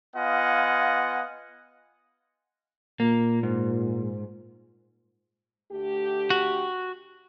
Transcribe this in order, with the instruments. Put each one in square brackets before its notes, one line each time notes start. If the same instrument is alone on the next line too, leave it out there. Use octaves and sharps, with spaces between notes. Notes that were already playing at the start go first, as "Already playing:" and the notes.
[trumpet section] B3 F4 D#5 F5 F#5 G#5
[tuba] A#2 [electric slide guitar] A#3
[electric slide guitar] G#2
[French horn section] D2 A3 G4
[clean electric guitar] F#4